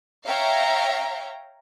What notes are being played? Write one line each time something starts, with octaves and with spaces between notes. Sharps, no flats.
C#5 E5 F5 G5 A#5